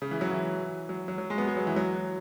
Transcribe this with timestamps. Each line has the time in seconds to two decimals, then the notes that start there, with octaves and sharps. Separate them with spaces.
0.02 C#3
0.11 E3
0.21 F#3
0.31 E3
0.89 F#3
1.08 F#3
1.18 F#3
1.30 G#3
1.38 B3
1.48 G#3
1.57 F#3
1.67 E3
1.76 F#3